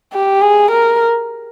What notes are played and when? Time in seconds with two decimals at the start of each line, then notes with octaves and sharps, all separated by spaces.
0.13 G4
0.41 G#4
0.71 A#4